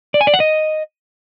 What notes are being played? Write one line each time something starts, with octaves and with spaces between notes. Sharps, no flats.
D5
G#5
D5
F#5
D#5